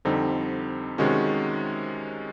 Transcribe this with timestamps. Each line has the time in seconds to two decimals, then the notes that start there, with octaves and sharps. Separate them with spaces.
0.05 F2 D3 G3 C4 D#4
0.98 C3 D#3 G#3 C#4 F#4